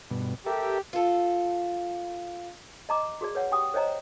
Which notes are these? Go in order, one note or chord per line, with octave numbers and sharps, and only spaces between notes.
G2 B2
G4 A4 A#4 E5
F4 A4
D#5 A#5 D6
F#4 G#4 D5
B4 C#5 F#5
G4 G5 D#6
C5 C#5 D#5 G5 A#5